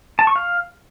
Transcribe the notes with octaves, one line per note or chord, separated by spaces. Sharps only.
A5
C#6
F5